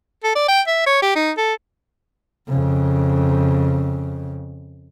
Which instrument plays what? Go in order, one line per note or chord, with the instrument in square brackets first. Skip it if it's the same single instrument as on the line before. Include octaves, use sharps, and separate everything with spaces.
[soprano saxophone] A4
D5
G5
E5
C#5
G4
D#4
A4
[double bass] F2 C#3